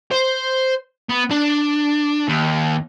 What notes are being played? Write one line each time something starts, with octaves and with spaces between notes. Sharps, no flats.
C5
B3
D4
D#2